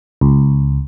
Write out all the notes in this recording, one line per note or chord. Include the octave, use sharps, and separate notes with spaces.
C#2